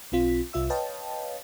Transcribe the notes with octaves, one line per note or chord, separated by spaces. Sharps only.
B1 C4 F4 B6
C2 F4 E5 E6
B4 C#5 D#5 F5 G5 A5